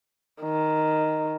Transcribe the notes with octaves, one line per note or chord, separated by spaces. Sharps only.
D#3